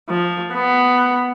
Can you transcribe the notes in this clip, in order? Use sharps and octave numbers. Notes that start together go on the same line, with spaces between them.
F3
B3